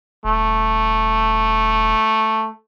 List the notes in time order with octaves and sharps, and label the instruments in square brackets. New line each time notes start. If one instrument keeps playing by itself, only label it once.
[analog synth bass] D#1 [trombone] A3